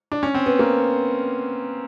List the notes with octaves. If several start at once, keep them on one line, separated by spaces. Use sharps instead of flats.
D4
C#4
C4
B3
A#3